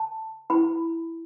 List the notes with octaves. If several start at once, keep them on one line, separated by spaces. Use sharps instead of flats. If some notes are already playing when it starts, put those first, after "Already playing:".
Already playing: A5
E4 B5